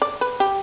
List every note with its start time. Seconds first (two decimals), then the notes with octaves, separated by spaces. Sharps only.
0.02 D5
0.21 B4
0.40 G4